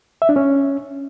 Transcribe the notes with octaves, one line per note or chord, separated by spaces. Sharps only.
E5
D4
C#4